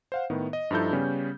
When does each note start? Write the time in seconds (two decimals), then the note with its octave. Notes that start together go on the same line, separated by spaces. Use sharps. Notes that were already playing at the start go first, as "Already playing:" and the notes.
0.12 C5 F5 F#5
0.30 A2 D#3 B3
0.53 D#5
0.71 G2 F3 D#4 E4 A4 G6
0.93 C#3 G3 B3 C#4